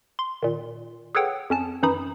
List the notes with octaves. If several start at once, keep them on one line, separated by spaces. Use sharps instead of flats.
C6
A#2 D#3
G#4 A4 B4 C#5 F#5 G5
F2 C#4 A5
F#2 E3 D#4 B5 D#6